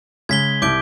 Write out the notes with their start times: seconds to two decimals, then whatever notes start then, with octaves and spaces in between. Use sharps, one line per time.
0.29 C#3 G#3 G#6 B6 G7
0.62 C2 D6 G6 D7